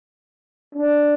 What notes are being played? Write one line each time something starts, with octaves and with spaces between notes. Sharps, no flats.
D4